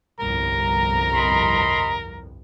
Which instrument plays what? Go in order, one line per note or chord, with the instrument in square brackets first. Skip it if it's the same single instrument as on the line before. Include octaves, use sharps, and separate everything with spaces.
[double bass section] G1 C2 F2 [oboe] A#4 [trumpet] A#5
[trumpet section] D#5 B5 C6